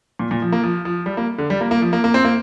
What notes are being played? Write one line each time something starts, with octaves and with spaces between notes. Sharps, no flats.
A#2
A#2
F3
A#3
F3
F3
G3
A#3
D3
G3
A#3
A#3
F3
A#3
A#3
C4
A#3